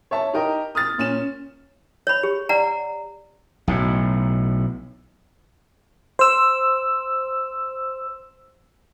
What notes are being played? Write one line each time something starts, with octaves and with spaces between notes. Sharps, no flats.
C#5 E5 A5
D#4 G4 A#4 D#5
D#6 F6 A6
A#2 C#4 E7
C#5 B5
G4
D5 F#5 A#5
B1 A2
C5 E6